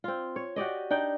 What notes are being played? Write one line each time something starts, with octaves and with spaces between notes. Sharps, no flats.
C4 F4
C#5
F#4 G4 D5 D#5
D4 D#4 G5